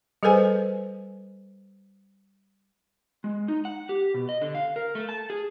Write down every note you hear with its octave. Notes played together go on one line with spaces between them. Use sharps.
G3 G#4 A4 B4 C5 G#5
G#3
D#4
F#5
G4
B2
D#5
D3
F5
A#4
A3
A5
G#4